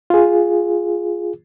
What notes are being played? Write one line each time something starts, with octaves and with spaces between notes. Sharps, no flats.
F4 G#4